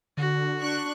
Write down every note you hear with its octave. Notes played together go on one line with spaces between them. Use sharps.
D3 F#4
D4 C#6 F#6